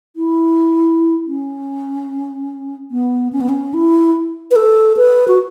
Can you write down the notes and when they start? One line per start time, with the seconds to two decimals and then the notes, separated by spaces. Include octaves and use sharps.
0.16 E4
1.27 C#4
2.91 B3
3.33 C#4
3.41 B3
3.49 C#4
3.74 E4
4.51 B4
4.56 A4
4.97 B4
5.28 F#4